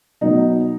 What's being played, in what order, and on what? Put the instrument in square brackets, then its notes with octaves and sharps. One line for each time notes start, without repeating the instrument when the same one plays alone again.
[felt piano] B2 F#3 B3 D#4